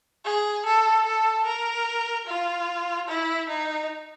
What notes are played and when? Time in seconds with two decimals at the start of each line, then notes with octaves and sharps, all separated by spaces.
0.25 G#4
0.66 A4
1.06 A4
1.46 A#4
2.27 F4
3.08 E4
3.49 D#4